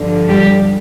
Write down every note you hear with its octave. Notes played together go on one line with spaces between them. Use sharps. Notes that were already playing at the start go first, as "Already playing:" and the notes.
Already playing: G2 D3 F3
G3 G4